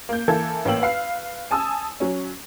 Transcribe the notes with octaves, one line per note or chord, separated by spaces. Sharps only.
A#3 G6
E3 A#3 A4 G#6
A1 A#3 C#5 G5 E6 F#7
B4 F5 C7
G#5 A5 D#6 E6
F#3 C#4